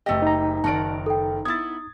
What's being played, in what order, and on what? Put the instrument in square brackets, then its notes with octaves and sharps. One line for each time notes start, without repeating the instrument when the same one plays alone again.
[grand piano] F#1 G4 [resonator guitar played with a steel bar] A3 D#5
[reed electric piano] D#4 A#5
[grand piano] F#1 D#3 D7 [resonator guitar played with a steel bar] F#4 A#4 D5 [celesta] A5
[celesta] A4 G5
[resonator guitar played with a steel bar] B3 E4 [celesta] D#6 [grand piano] G#6 A6